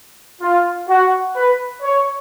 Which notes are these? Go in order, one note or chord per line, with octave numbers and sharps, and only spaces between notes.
F4
F#4
B4
C#5